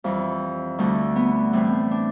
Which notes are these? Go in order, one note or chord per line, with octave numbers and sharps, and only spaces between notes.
F2 E3 G3
D2 D3 G3 A3
B3
A2 E3 G3 C4
D4